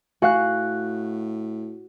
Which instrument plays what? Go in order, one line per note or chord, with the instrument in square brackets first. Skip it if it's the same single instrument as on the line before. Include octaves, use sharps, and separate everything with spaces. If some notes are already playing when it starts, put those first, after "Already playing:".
[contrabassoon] A2 [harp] F#4 F#6 [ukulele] F5 G#5